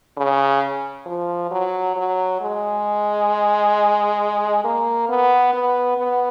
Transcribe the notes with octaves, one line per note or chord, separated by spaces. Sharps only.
C#3
F3
F#3
F#3
G#3
A#3
B3
B3
B3